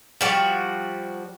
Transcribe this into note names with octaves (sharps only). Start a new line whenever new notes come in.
F3 G3 F#4